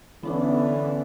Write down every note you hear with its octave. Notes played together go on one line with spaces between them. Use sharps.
D3 E3 B3 C#4 D4